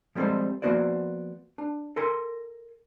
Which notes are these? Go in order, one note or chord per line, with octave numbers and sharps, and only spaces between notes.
F3 G3 G#3 C4 A4 C5
F3 A#3 B3 F#4 C5 D5
D4
A4 A#4 G#5 C6